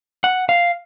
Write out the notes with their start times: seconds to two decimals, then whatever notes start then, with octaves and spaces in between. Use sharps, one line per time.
0.24 F#5
0.49 F5